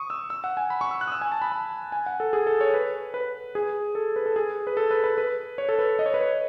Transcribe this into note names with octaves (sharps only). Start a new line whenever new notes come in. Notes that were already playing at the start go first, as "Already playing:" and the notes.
Already playing: C#6 D#6
E6
E6
F#5
G#5
B5
C#6
E6
F#6
D#6
E6
G#5
A5
B5
A5
G#5
F#5
A4
G#4
A4
C#5
B4
B4
G#4
A4
B4
A4
G#4
B4
A4
B4
B4
B4
C#5
A4
B4
D#5
C#5
B4
C#5